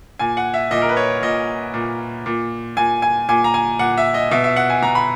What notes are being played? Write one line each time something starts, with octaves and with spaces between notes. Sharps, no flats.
A#2 G#5
F#5
E5
A#2 D#5
A#4
B4
C#5
A#2 D#5
A#2
A#2
A#2 G#5
G#5
A#2 G#5
A#5
G#5
A#2 F#5
E5
D#5
B2 E5
E5
F#5
G#5
B2 A#5
B5